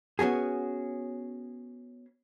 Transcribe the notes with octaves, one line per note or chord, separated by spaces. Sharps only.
B3 C#4 F#4 G#4